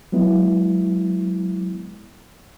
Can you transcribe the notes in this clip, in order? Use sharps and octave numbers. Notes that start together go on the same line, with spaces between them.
F#3 G#3 B3 E4